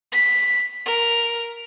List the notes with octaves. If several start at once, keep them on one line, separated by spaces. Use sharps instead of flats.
B6
A#4